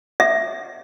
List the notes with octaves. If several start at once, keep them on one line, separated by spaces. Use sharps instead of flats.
E5